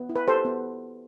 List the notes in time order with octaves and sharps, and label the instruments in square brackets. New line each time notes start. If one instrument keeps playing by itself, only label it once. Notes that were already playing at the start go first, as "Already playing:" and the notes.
Already playing: [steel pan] B3
E4
B4
G4 A4 C5
B3